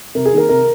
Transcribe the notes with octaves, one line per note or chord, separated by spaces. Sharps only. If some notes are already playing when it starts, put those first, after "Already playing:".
C3 A#4
G#4
D#3 A#3 A#4
C3 A#4